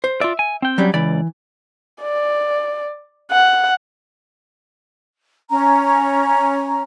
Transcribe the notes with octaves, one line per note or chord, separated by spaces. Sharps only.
C5
F4 D5 E5
G#5
C4 G5
F#3 G3 C#4
C#2 E3 D5 B5
D5
F#5
C#4 A#5